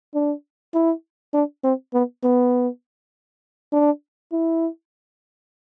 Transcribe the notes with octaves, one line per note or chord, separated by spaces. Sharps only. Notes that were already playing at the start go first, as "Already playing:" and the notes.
D4
E4
D4
C4
B3
B3
D4
E4